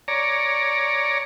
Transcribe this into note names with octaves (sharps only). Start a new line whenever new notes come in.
C#5 D5 A#5